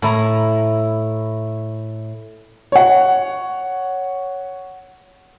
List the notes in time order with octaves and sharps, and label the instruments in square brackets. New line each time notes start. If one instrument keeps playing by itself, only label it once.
[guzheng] A2 E4 A#5
[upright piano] C#5 F#5